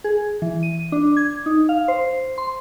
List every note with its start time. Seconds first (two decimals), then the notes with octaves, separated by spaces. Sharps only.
0.04 G#4
0.42 E3
0.63 D#7
0.92 D4
1.17 G#6
1.46 D#4
1.69 F5
1.88 C5
2.38 C6